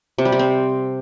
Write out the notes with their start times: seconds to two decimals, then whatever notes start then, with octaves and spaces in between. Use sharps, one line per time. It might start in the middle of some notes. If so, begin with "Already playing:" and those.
0.18 C3
0.25 G3
0.32 C3
0.39 C4